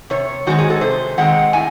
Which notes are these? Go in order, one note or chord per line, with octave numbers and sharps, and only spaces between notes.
C3 C#5
D#3 G#3 C4 F#4
G#4
A4
C3 C5
D#3 G#3 C4 F#5
A2 G#5